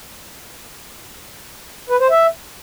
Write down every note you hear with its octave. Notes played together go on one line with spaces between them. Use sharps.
B4
C5
E5